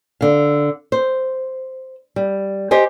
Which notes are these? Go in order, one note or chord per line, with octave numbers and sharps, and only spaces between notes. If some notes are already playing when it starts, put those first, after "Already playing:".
D3 F5
C5
G3
G4 C5 D#5 G#5